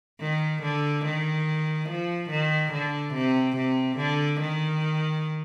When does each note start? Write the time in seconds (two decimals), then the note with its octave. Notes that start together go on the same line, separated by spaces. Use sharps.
0.21 D#3
0.63 D3
1.05 D#3
1.89 F3
2.30 D#3
2.72 D3
3.14 C3
3.57 C3
3.98 D3
4.41 D#3